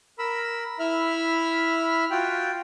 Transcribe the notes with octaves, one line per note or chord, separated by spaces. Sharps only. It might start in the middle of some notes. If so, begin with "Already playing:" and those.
A#4 B5 E6
E4 E5 B5 F6
F4 F#4 G5